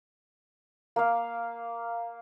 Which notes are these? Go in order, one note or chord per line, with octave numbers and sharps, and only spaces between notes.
A#3 F5